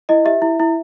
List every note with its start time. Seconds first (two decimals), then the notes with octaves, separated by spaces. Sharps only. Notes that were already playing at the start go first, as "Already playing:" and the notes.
0.09 E4 D#5
0.25 G4 E5
0.42 E4
0.59 E4